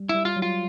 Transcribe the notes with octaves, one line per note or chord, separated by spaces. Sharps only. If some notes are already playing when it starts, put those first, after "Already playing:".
Already playing: G3
E4
G3
F4
F#3
F4